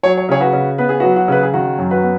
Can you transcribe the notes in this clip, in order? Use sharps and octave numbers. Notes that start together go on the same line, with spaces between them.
F#3 C#5
C#5
C#3 G#4 C#5
F#4 B4
C#3
B3 B4
G#4
F#3 F#4 B4
F#4
C#3 B4
G#4
D#3 F#4
F#2
F#4 B4
B3